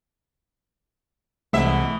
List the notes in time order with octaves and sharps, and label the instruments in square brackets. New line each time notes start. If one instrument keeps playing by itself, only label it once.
[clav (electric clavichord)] C2 G#3 [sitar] B2 E3 E5 [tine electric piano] A3